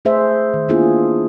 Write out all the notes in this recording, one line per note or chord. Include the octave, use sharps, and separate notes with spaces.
A3 G#4 C5 E5
D#3
A#3 B3 D4 E4 F4 G#4